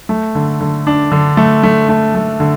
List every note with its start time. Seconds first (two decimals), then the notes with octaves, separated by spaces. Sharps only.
0.09 A3
0.35 D3
0.61 D3
0.87 D4
1.12 D3
1.37 A3
1.63 A3
1.89 A3
2.15 A3
2.40 D3